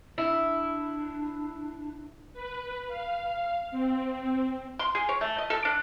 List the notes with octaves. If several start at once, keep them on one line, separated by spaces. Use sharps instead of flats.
D4 E4
B4
F5
C4
C6
G#4
C#5
A3
D#5
A4
D4